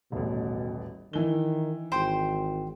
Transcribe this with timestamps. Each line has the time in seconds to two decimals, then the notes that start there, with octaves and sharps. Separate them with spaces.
0.12 D#1 A1 B2
1.13 D#3 E3 G7
1.92 G#1 C5 G5 C6